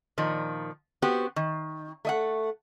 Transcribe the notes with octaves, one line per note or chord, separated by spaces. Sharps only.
A#2 D#3 F3
B3 C4 F#4 G4
D#3
A3 D#5 F#5